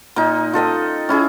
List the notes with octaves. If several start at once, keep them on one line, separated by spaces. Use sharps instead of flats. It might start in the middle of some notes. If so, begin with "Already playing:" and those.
A#2 D#4
F4 A4 D#5 G5
C#4 E4 G#4